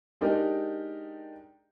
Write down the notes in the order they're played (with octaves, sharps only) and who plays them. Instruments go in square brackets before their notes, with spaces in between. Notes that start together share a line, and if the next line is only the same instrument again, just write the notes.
[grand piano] G#3 D4 D#4 G4 A#4